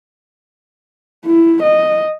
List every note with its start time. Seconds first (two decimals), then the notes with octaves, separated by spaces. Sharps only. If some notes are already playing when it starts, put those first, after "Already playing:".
1.26 E4
1.63 D#5